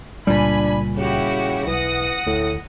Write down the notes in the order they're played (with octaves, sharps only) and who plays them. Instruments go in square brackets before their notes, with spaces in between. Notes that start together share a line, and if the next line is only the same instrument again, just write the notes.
[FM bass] C#2 [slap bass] A#2 G3 [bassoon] D4 [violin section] G#5 B5
[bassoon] C#3 [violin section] E4 F#4 G4
[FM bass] B1 [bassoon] E3 [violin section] F#5 D#6 A#6
[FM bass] D2 [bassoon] A2